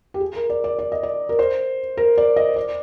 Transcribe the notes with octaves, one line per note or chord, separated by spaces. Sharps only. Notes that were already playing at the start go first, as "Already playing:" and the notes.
G4
G#4
A#4
D5
D5
D5
D#5
D5
A#4
C5
A#4
D5
D#5
D5